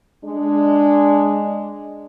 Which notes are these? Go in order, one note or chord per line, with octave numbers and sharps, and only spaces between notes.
G#3 D4